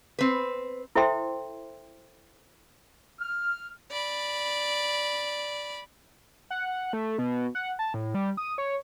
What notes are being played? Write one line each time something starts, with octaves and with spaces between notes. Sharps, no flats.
C4 B4
E4 A4 C5 E5 G5 C6
F6
D5 B5
F#5
A3
B2
F#5
A5
A2
G3
D#6
C#5